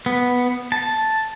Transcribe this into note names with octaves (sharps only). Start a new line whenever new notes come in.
B3
A5